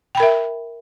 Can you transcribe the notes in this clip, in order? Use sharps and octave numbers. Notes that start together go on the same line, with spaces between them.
A#4 E5 G5 B5